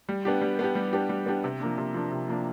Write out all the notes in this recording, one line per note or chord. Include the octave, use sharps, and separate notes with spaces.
G3
B3 D4 G4
G3
B3 D4 G4
G3
B3 D4 G4
G3
B3 D4 G4
C3
F3 A#3 D4
C3
F3 A#3 D4
C3
F3 A#3 D4